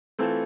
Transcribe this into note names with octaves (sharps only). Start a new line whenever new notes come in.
E3 A3 C4 F4 A4